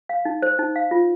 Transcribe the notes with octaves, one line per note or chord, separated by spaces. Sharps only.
F5
D#4
C5
D#4
F5
F4